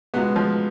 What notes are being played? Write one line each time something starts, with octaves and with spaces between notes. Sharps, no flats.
C#2 B2 G#3 B3
F3